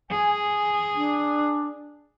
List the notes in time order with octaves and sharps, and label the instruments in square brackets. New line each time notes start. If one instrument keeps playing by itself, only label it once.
[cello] G#4 [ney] G#5
[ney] D4